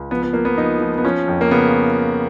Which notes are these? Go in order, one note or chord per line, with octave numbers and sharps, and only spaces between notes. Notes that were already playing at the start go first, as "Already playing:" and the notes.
Already playing: C#2
F3 B3
B3
F3 A#3
B3
F3 D#4
F3
B3
F3 C#4
F2
A#3
C#3 B3